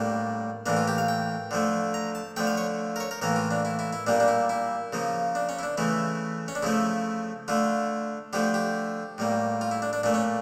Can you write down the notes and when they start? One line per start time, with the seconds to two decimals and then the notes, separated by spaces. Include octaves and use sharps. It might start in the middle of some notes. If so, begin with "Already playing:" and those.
Already playing: A2 G3 A#3 D4
0.66 A2 E3 A#3 D4
0.77 F4
0.88 G4
0.98 F5
1.08 G5
1.51 D3 F3 A3
1.94 A#5
2.15 A5
2.36 D3 F3 A3 G5
2.47 F5
2.57 C#5
2.96 A#4
3.00 C#5
3.11 A#4
3.21 A2 E3 A#3 A#4
3.36 F4
3.51 D4
3.65 E4
3.79 E4
3.93 E4
4.07 A#2 G3 A#3 D4
4.20 D4
4.28 E4
4.49 E4
4.93 C#3 F3 A#3
5.35 D4
5.49 C#4
5.59 E4
5.63 D4
5.78 C#3 E3 A3 E4
6.48 C#4
6.55 D4
6.63 C#3 F3 A3 E4
7.48 D3 A3 F4
8.33 D3 F3 A3 G4
8.54 G4
9.18 A2 G3 A#3
9.61 F4
9.71 E4
9.82 D4
9.93 D4
10.03 A#2 A3 D4
10.14 C#4